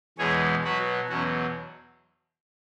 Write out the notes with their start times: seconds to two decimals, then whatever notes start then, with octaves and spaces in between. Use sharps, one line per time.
0.18 E2 B2 G#3 G#4 C#5
0.64 B2 F#3 F#4 B4
1.09 E2 B2 F#3 C#4 F#4